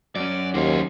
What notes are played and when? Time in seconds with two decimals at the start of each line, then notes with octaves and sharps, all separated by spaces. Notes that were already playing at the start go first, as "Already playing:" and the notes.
0.16 F#2 C#4 D5
0.54 D#2 F#4 C5